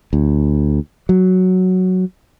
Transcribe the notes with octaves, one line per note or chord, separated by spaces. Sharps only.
D2
F#3